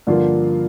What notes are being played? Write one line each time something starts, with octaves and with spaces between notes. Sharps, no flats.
G2 D3 F3 A#3 F4